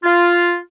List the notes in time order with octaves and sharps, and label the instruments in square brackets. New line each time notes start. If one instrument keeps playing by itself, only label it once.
[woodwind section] F4